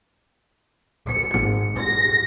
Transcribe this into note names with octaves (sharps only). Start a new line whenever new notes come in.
C#7
G#1
A#6